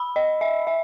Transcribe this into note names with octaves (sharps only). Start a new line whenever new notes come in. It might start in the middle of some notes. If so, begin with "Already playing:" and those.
Already playing: B5 E6
D#5
E5
E5